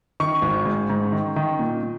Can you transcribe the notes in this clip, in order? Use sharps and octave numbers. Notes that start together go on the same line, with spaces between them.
D#3 C#6
G#1
G#2
G#2
D#3
D#3
A#2
A#2